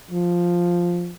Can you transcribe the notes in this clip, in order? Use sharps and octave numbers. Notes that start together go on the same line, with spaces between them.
F3